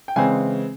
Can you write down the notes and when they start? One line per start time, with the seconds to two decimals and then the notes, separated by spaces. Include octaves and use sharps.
0.08 G5
0.16 C#3 E3 G#3 C4 G#5